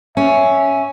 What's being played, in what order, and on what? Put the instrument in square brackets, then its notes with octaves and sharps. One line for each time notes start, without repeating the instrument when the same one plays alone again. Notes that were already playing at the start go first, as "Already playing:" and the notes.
[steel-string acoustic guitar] C#4 [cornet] E5